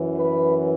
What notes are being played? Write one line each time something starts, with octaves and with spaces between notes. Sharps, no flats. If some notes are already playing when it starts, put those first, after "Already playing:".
Already playing: F#2 E3
B4